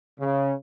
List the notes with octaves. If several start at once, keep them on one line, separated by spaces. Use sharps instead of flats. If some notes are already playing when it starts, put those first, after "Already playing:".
C#3